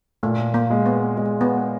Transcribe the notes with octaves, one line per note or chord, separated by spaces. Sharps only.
A#2 A3
A#3
G#3
B3
G#3
B3